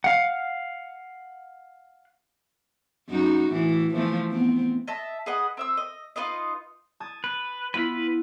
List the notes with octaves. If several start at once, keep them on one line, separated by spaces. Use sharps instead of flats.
F5 F#5
F#2 D#4 F#4
A2 E3
E3 F3 A3
B3 C4
D#5 E5 A5
G#4 B4 D#5 F#5
C4 E5 E6
D#5
D#4 F4 B4 D#5
A5 D#6 G#6
B4
B3 E4 F4 B4 B5